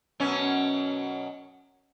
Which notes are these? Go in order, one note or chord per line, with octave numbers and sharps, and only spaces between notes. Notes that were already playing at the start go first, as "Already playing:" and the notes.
F#2 B2 C#4